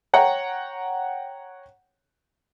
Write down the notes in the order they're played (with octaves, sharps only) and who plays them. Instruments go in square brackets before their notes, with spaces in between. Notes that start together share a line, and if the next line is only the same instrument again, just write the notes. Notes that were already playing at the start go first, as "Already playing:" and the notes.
[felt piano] C#5 F#5 G5 A#5